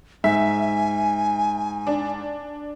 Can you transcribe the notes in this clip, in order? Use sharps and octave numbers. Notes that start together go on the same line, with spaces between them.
G#2 E5 G#5
D4